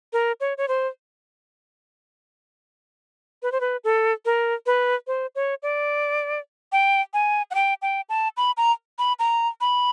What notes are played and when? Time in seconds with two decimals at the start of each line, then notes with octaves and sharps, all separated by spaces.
0.13 A#4
0.40 C#5
0.58 C#5
0.68 C5
3.43 B4
3.52 C5
3.61 B4
3.84 A4
4.25 A#4
4.66 B4
5.07 C5
5.35 C#5
5.63 D5
6.72 G5
7.14 G#5
7.51 F#5
7.55 G5
7.82 G5
8.09 A5
8.37 B5
8.57 A#5
8.99 B5
9.19 A#5
9.61 B5